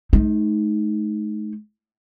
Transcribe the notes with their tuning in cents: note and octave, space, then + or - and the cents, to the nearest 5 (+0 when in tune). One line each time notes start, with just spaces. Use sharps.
A3 -45 D#4 +5